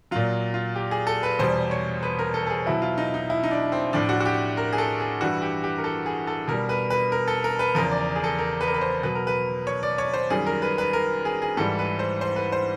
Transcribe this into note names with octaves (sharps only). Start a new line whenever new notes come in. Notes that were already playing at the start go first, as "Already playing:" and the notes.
A#2 F#3 F4
F4
G4
G#4
A4
B4
E2 B2 G3 C5
C#5
B4
A#4
A4
A4
G#4
B2 F#3 E4
F4
D#4
D#4
E4
D#4
D4
C4
A2 F3 D4
F#4
F#4
G4
A#4
G#4
A4
G#4
G2 E3 G3 F#4
G4
G4
A#4
A4
G#4
A4
B2 G3 A#4
B4
B4
A#4
A4
A#4
B4
E2 C#3 F3 A#4
D5
G#4
A4
A#4
B4
A#4
B4
C5
B2 F#3 B4
A#4
B4
C#5
D5
C#5
C5
F#2 D#3 G3 G#4
A#4
B4
B4
A#4
G#4
G#4
G#2 E3 G3 A4
B4
C5
C5
B4
C5